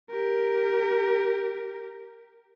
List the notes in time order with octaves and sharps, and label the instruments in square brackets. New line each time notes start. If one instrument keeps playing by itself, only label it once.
[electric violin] G4 A#4